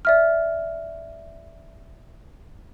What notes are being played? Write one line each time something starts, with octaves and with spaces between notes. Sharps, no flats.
D5 E5 F6